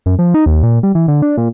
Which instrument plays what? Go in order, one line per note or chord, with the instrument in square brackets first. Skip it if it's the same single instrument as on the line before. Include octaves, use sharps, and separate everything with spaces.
[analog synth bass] F#2
F3
D#4
D#2
A#2
G3
E3
D3
D4
A#2